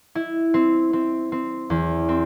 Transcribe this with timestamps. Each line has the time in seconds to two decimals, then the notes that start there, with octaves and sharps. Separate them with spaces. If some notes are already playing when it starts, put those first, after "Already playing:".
0.15 E4
0.54 C4
0.93 C4
1.32 C4
1.70 E2
2.09 C4